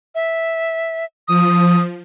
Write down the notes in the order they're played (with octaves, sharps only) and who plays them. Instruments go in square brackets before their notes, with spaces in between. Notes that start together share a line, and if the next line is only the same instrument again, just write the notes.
[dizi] E5
[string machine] F3 [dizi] D#6